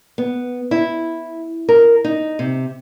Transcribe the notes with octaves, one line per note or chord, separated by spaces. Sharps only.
B3
E4
A#4
D#4
C3